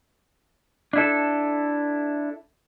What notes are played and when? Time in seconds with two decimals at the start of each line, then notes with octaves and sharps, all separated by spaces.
0.93 D4 E4 A4